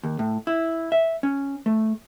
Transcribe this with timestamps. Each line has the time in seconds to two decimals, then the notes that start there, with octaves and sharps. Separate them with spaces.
0.03 D#2
0.19 A2
0.47 E4
0.92 E5
1.23 C#4
1.66 A3